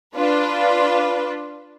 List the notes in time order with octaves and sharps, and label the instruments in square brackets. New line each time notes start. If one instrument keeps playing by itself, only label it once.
[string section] D4 F4 B4